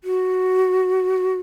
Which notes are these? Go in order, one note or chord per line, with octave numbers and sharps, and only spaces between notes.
F#4